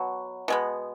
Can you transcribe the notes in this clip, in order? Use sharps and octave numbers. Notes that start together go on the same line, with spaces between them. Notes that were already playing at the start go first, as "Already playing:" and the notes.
Already playing: B2 F#3
B2 G#3 B3